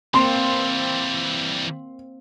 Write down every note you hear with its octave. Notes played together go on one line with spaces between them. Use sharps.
E3 G3 A#3 C4 C6